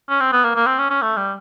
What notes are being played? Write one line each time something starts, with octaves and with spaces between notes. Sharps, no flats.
C#4
C4
B3
A#3
A#3
C4
C#4
C#4
A3
G3